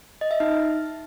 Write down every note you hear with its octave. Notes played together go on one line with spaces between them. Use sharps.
D#5
E5
D#4